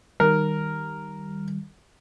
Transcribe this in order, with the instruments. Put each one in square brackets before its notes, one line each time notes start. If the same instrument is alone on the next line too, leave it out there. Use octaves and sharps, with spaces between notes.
[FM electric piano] D#3 G3 [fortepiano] A#4